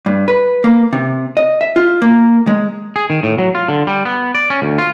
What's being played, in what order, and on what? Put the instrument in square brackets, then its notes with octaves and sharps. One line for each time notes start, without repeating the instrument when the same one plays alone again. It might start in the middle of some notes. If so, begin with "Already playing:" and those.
[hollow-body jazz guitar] G2
B4
A#3
C3
D#5
E5
F4
A#3
G#3
[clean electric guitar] G#4
D#3
A2
F#3
F4
D3
G3
B3
D5
C#4
D2
F4